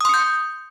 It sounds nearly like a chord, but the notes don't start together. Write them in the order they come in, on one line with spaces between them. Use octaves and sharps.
D#6 C6 C#7 G6